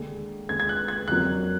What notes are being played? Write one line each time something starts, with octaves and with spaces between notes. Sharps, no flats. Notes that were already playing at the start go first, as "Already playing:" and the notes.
Already playing: D#2 D3 G#3
D#2 D3 G#3 G#6
G#6
F#6
G#6
F2 D3 F#3 A#3 F#6